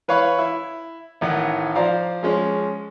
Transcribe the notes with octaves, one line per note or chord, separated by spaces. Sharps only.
E3 B4 C#5 F5 C#6
E4
A1 A2 D#3 F#5
F3 C5 D5 F5 A#5
F3 G#3 C#4